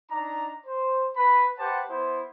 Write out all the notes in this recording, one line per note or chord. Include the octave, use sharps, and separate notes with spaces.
D4 D#4 A#5
C5
B4 B5
G4 B4 C5 F#5 A5
B3 E4 C5